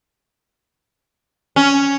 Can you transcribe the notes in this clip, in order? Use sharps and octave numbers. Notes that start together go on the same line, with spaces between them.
C#4